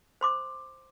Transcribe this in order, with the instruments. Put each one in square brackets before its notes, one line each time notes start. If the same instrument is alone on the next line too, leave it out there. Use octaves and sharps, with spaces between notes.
[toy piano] C5 C6 D6